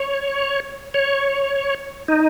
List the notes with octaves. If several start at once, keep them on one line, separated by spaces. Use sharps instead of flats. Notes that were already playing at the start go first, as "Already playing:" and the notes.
Already playing: C#5
C#5
D#4